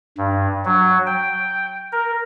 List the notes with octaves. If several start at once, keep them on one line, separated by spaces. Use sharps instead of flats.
G2
F#3
G5
A#4